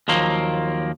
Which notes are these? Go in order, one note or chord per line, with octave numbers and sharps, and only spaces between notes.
D#2 F3 F#3 A#3